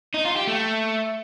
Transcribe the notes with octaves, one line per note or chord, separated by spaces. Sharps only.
D#4
F4
G4
A3